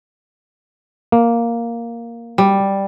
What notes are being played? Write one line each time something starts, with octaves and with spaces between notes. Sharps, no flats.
A#3
G3